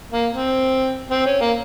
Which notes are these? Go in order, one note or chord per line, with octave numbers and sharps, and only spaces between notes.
A#3
C4
C4
C#4
A#3